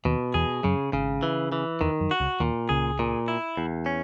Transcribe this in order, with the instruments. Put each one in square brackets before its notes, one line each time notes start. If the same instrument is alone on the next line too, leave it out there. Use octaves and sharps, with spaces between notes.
[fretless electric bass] D#2 D#3 [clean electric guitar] B2
[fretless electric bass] E2 E3 [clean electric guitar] G#4
[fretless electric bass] F#2 F#3 [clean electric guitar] C#3
[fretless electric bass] G#1 G#2 [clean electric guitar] C#3
[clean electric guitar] E3
E3
[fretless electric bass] E2 [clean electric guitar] D#3
[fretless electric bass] F#2
[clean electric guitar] F#4
[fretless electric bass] C#2 C#3
[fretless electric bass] D#2 D#3 [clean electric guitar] A#2
[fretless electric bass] C#2 C#3 [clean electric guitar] G#4
[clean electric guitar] A#2
E4
E2
C#4